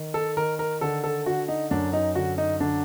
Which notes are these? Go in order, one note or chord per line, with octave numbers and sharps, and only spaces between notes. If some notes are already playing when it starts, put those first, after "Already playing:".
Already playing: D#3
A4
D#3 A#4
A#4
D3 A4
A4
D3 F#4
D#4
F#2 D4
D#4
D3 F#4
D#4
D3 D4